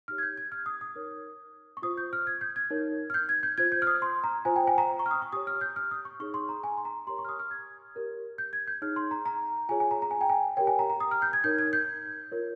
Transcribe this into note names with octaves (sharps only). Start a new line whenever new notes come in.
D#4 G4 C#5 F6
G#6
G6
G#6
F6
D#6
D#6
D#4 A#4 C#5
C#6
F4 C5 D#6
G6
F6
G#6
G6
G#6
D#4 A#4 C#5
F6
G6
G#6
G6
F4 C5 G#6
G6
F6
D#6
C6
A#5
F4 C5 G#5
G5
G#5
A#5
C#6
F6
D#6
C#6
G4 C#5 D#6
F6
G6
F6
D#6
C#6
D#4 G#4 C#5 C#6
C6
A#5
G#5
C6
A#5
G4 A#4 C#5 C6
C#6
F6
D#6
F6
G#6
G4 A#4 C#5
G6
G#6
G6
D#4 G#4 C#5 F6
C6
A#5
A#5
F4 G#4 C#5 G#5
G#5
A#5
A#5
G#5
G5
G#5
G4 A#4 C#5 G5
G#5
A#5
A#5
D#6
F6
G6
G#6
D#4 A#4 C#5 G6
G#6
G6
F4 A#4 C#5